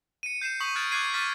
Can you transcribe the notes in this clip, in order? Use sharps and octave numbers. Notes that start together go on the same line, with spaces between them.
C#7 D#7
G6 C7 D#7 E7
C#6 D#6 B6 F#7
F6 F#6 G#6 A6 D7 E7
D6 F#6 G#6 C7 D#7
C#6 D6 F6 A6 B6